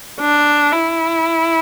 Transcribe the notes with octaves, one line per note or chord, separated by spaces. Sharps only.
D4
E4